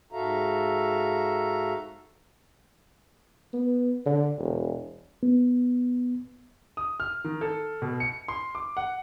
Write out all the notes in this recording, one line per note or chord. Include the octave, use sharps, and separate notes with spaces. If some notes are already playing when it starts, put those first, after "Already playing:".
G#2 F#4 A4 E5 F5 A#5
B3
D3
E1
B3
D#6
F6
D#3
A4
B2
C#7
C6
D6
F#5